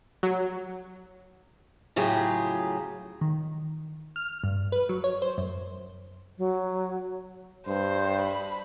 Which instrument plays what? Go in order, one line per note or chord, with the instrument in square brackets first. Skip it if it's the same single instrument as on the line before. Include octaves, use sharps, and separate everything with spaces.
[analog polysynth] F#3
[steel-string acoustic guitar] A2 C#3 F#3 F4 G4 G#4
[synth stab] D#3
F6
G2
B4
F#3
C#5
C5
F#2
[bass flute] F#3
[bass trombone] G2 [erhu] C5
[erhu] B5